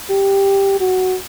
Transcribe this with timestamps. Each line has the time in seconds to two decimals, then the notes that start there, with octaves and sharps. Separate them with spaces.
0.10 G4
0.80 F#4